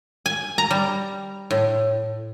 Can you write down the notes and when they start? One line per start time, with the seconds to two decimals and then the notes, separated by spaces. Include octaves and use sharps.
0.26 G#5
0.58 A#5
0.71 G3
1.51 A2